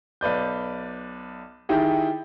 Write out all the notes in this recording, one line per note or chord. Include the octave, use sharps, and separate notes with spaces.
B1 B4 D5 G6
D#3 D#4 E4 G4 G#4